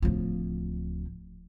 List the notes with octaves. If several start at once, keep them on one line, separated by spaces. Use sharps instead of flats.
D1 F3